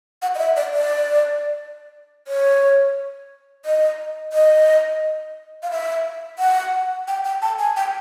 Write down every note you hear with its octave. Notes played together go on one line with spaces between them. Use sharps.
F#5
D#5
E5
D5
D5
C#5
D#5
D#5
F5
E5
F#5
G5
G5
A5
G#5
G5